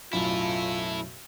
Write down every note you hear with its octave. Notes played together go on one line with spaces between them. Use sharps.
B1 F#2 A2 E4 F4 A4